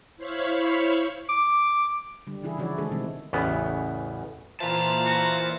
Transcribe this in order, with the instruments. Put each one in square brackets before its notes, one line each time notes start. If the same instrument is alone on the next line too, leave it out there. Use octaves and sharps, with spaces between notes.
[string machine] E4 C5 C#5 F5 B5 C#6
[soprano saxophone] D6
[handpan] D3 G3
C#3 E3 E4 G#4
E3 F3 E4 F#4 C#5 D5
D#3 G#3 A3 D4 G#4 A4
B2 D3 D#3 G3 G#3 C4
[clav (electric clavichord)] A1 E2 A2 C#3 B3
[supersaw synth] A#2 E3 F4 [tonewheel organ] C5 E5 A6 [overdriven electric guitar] A5 A#5
[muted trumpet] F#4